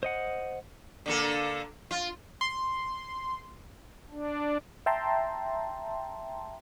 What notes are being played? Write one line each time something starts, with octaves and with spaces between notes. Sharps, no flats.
C5 D#5 F#5
D3 A#3 A4
F4
C6
D4
E5 G5 A5 A#5 C6